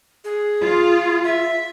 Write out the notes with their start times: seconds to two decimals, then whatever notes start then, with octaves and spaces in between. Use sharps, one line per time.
0.24 G#4
0.59 F4
1.24 E5